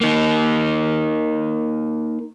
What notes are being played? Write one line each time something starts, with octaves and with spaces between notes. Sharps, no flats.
A#3 D#4